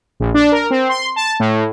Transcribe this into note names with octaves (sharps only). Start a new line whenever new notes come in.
A#1
D4
A#4
C4
C6
A5
A2